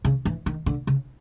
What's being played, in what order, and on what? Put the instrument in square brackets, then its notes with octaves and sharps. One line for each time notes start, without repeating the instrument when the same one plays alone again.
[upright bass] C#3
E3
D#3
D3
C#3